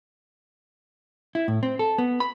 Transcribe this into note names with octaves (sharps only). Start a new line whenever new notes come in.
E4
A2
C4
A4
B3
B5